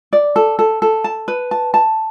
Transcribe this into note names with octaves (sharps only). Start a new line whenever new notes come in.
D5
A4
A4
A4
A5
B4
A5
A5